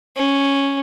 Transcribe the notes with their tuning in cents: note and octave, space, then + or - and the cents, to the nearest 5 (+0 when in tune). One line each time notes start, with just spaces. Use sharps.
C#4 -5